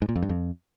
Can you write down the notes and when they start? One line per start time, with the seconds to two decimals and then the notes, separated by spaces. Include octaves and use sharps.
0.02 G#2
0.09 A#2
0.16 F2
0.22 G2
0.29 F2